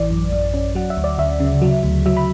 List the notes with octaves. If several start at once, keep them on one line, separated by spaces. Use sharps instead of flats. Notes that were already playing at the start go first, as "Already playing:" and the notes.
Already playing: A1 E3 D5
F#2
F#2
C#4
F#3 F#5
E5
D2
D5
D2 E5
C#3
F#3
D2
F#3 E5
B5